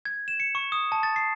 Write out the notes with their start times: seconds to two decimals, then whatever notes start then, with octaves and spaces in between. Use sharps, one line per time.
0.05 G#6
0.28 E7
0.40 C#7
0.55 C#6
0.72 D#6
0.92 A5
1.03 A6
1.16 C7